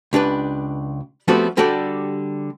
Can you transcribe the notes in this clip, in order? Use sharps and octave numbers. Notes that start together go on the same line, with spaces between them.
C#2 D4 G4 B4
F3 G3 A3 B3 C4 F#4
D3 G3 F#4 G4 A4 D5